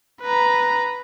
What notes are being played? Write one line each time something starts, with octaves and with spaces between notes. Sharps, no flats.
B4 A#5